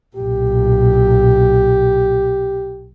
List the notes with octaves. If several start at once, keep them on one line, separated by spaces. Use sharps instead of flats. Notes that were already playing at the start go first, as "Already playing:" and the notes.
B1 A#2 G4